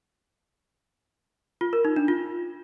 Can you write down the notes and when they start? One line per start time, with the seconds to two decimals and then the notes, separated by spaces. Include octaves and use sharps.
1.61 F4
1.73 A#4
1.85 D#4
1.96 D4
2.08 F4